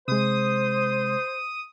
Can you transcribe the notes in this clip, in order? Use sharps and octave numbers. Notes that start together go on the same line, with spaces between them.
C3 G#3 C5 D#6